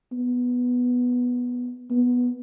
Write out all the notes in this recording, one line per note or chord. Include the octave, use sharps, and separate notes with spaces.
B3
B3